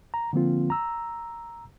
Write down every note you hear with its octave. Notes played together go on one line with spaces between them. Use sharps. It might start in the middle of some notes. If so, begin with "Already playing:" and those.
A#5
D3 F3 A#3 C4 F4
A#5 E6